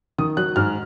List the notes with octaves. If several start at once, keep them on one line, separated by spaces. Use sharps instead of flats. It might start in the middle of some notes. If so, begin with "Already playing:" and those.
D#3 D#6
F#3 F#6
G#2 F6